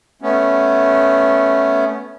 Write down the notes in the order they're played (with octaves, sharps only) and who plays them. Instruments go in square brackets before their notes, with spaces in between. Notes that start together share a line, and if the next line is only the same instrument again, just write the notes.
[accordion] A3 B3 C#4